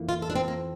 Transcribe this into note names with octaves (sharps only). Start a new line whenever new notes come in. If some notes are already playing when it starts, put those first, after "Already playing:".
Already playing: F2 E3 A#3
F4
A4
D4
C4
A#3